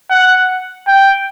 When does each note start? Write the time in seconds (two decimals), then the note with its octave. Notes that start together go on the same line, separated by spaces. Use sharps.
0.11 F#5
0.87 G5